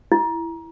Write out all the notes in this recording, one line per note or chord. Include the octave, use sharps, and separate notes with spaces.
E4